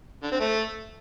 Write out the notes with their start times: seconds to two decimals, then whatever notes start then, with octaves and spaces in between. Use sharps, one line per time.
0.23 D3
0.32 C4
0.40 A3